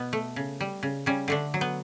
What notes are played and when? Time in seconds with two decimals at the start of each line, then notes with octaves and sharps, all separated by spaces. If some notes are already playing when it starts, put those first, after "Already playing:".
Already playing: B2 B3
0.13 A3
0.36 C#3
0.61 G3
0.83 C#3
1.06 C#3 G3 C#4
1.28 D3 A3 D4
1.54 F#3
1.61 B3